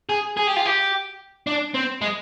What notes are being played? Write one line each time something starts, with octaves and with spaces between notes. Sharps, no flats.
G#4
G#4
G4
F4
G4
D4
C4
G#3